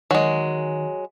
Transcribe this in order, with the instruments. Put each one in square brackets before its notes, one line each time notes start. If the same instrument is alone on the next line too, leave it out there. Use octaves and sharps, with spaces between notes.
[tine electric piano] D#3 [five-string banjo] F#3 G#3